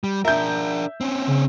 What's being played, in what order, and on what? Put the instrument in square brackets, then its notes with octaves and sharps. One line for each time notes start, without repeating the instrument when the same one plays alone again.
[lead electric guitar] G3
[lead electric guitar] D4 A#4 [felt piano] E5 G6
[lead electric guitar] C4 C#4
[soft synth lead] C#3